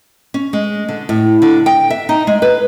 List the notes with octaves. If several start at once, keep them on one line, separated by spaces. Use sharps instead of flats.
C#4
G#3
D3
A2
D3
G5
E5
D#4
G#3
B4